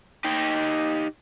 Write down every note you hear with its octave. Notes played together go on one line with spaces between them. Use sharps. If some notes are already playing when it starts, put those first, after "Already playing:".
D#4 G4